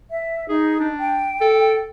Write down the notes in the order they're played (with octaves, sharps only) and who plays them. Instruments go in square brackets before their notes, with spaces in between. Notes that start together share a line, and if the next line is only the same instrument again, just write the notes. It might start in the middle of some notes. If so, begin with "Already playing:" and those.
[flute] E5
[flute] D#4 [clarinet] G#4
[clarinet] D4
[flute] G5
[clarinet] A4